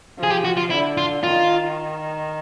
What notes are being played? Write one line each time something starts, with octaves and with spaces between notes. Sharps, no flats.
F3
G#4
G4
F#4
F4
D3 E4
F4
D#3 F4